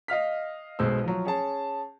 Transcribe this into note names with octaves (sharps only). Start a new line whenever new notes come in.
D#5 F5 F6 B6
B1 B2 G#3 C5 E6
F3 F#3
C#4 G#4 A5